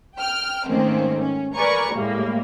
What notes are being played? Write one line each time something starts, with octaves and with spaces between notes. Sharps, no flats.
G5 F6
G#2 D#3 A3 A#3 C4 C#4
C#4
A#4 B4 D5 G#5 A#5 C#6
A2 G3 G#3 A#3